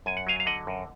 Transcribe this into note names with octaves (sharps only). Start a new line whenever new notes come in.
F#2 G#5
F#5
F#3 F5 G#5
F5
D3 D#5 F#5
F#2